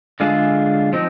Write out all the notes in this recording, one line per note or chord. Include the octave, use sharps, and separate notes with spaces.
D3 G#3 D4 F4 G#4
F3 C4 D#4